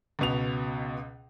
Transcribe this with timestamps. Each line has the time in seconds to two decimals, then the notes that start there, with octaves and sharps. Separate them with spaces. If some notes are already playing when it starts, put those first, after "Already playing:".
0.19 C#2 B2 F7